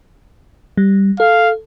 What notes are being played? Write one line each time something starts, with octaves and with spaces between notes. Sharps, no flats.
G3
A4 F5